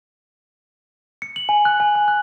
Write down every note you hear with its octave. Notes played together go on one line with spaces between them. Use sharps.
C#7
F#7
G#5
F#6
G#5
G#5
F#6